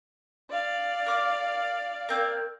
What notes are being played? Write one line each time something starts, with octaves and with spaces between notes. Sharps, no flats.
D5 F5
A#4 D6 F6
A#3 C4 A#4